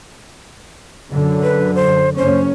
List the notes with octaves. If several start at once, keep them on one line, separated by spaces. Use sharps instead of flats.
F#2 D3
B4
C5
F#1 C#4 C5